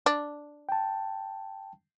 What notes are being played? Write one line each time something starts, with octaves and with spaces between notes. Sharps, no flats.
D4
G5 A5